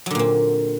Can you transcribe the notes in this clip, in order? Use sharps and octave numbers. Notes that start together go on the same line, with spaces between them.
A#2 D3 F#3 C4